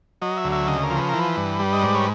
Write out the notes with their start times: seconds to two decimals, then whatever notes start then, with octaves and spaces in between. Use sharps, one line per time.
0.22 F#3 D#5
0.37 E5
0.44 D2
0.52 E5
0.68 C#3 D#5
0.83 A#4
0.91 F3
0.98 B4
1.09 E3 A#4
1.19 B4
1.37 G2
1.60 G3
1.73 D#5
1.83 G#2 D5
1.95 C#5